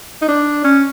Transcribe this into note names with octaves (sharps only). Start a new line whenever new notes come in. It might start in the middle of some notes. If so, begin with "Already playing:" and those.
D#4
D4
C#4